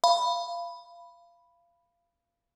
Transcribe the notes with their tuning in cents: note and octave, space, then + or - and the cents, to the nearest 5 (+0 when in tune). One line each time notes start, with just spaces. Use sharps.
F5 -20 B5 +0